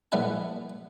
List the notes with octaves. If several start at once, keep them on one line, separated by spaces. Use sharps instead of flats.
A#1 G3 A3 E4 F#5 G#5